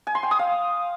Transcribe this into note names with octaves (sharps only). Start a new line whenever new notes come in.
G#5
C6
G5
D#6
F5